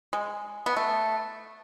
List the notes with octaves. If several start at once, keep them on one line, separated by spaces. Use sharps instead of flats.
G#3
B3
A3